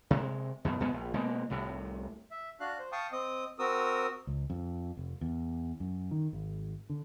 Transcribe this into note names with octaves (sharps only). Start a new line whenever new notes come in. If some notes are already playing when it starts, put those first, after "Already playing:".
C3 G#3
F#2 B2
F2 B2 G#3 B3
A#1
B2 G#3 A#3 C4
C2 A2 C3
E5
D4 F#4 F5 F#6
C5
F5 G5 A5 C#6 D#6
C4 D#5 D#6
C4 F#4 A#4 D#6 E6
C#2
F2
F1
E2
F#2
D#3
G#1
D3